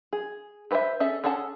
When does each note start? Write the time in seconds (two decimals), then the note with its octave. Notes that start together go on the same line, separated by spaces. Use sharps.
0.13 G#4
0.71 G4 B4 C5 D5 E5
1.00 C#4 G#4 A4 E5
1.24 C#4 G#4 A4 F#5 A5